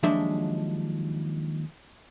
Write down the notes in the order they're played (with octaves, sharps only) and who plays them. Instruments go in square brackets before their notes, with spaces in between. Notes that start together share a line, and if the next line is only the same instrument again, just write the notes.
[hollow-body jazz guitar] D#2 F3 F#3 G#3 D4 E5